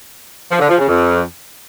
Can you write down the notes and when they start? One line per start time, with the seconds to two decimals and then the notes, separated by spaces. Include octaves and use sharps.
0.50 F3
0.59 D3
0.69 F3
0.78 C#3
0.87 F2